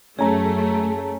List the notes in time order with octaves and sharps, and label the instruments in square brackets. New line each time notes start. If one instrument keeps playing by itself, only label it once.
[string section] F#2 [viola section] A3 [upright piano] C#4 A#5 [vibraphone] G#4 A5